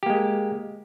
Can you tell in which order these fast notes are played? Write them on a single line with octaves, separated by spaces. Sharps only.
G4 A#3 G#3